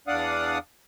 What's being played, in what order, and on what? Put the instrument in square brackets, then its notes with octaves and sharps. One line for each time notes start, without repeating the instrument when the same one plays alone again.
[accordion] E2 D4 D5 F5 F#5 D#6